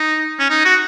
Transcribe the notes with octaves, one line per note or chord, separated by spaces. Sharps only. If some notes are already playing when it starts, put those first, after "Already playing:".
Already playing: D#4
C#4
D#4
F#4